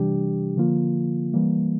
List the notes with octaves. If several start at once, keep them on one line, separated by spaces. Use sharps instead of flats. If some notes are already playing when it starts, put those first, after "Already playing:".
Already playing: C3 E3 G3 D4 G4
D3 F3 A#3 F4
E3 G3 A#3